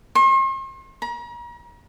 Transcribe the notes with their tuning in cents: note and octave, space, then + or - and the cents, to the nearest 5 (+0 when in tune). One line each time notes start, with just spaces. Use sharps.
C6 +45
A#5 +40